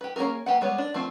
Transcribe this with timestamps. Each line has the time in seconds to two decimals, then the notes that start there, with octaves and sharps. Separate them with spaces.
0.01 G4 B4
0.16 A#3 C#4 F#4 G#4 A#4
0.46 A#3 G4 B4 F#5
0.61 G3 G#3 B3 C#5
0.78 D4
0.94 F3 A3 C4